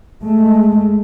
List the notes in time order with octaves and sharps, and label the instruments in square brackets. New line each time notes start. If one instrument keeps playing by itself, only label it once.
[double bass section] G#3 A3